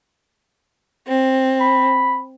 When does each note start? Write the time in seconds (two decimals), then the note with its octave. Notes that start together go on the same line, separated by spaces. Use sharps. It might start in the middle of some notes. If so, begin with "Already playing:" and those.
1.07 C4
1.60 B5